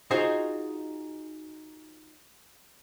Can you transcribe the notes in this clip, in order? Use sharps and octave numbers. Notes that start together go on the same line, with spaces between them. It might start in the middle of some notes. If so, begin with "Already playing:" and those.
D#4 F4 F#4 G#4 C5 D#5